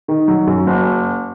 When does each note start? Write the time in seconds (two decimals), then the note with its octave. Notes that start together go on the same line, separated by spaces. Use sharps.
0.08 D#3
0.28 F#3
0.47 F#2
0.67 F#1